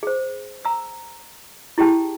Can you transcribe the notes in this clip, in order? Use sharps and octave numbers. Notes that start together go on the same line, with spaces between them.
G#4 C5
A#5 E6
E4 G4 G#4 G5 A5